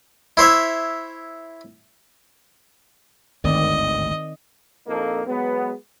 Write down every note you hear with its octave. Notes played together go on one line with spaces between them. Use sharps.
E4 C5 C#5 E5
G#1 D2 G2 D#3 C4 D5 D#5
A#1 F2 A#3 D#4 A4
F#3 G#3 B3